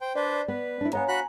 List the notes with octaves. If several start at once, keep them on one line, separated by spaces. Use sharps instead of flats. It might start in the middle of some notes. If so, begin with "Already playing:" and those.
C5 G5
D4 B4 C5 D5
B3 B4
D4 E4
B3 C#5 D#5 F5 G#5 A#5
F#4 B5 F#6